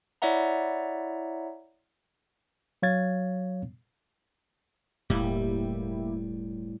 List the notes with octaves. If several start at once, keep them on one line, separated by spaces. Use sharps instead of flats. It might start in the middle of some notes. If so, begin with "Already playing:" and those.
E4 C#5 D5 E5 F#5 A#5
F#3 C#5 F5 G#6 A6
E1 A2 G3 A#3 E4 G4